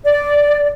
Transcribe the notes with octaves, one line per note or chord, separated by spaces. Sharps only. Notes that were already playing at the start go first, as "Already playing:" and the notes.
D5